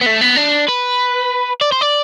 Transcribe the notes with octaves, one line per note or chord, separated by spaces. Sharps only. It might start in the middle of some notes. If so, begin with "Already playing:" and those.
B3
A3
B3
D4
B4
D5
C5
D5